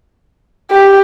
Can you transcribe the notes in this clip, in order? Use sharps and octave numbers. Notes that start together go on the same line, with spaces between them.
G4